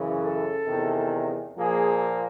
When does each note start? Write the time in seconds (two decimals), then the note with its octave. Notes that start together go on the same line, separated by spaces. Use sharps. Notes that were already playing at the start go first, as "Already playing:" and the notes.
Already playing: F#2 C#3 E3
0.22 A4
0.66 E2 C3 D#3
1.57 A#2 F3 A#3 G#4